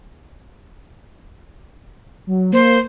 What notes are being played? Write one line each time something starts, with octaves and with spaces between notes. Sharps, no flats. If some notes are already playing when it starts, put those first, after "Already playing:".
F#3
A#3 C5